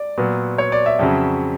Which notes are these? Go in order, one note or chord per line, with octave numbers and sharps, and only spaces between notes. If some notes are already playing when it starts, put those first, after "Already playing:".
Already playing: D5
A#2 F#3 B3
C#5
D5
E5
F2 C#3 F#3